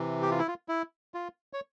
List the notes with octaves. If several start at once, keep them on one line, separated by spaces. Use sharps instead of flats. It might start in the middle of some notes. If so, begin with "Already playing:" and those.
Already playing: C3 E3
G4
F4
E4
F4
E4
F4
C#5